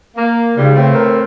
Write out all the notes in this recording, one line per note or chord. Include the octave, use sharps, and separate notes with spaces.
A#3
G#2 C#3 F3 G3
A2 E3 C4
A#4